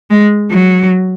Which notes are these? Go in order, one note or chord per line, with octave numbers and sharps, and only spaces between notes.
G#3
F#3